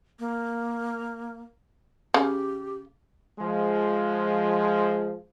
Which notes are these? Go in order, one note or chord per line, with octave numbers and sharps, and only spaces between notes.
A#3
C#3 G4
F3 G#3